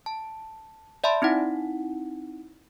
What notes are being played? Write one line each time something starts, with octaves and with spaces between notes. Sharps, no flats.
A5
D5 E5 A5 B5 C6
C4 D#4 E4 F#5